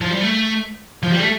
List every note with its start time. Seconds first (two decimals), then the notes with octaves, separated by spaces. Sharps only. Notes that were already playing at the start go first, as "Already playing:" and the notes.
0.01 F3
0.11 G3
0.21 A3
1.03 F3
1.11 G3
1.20 A3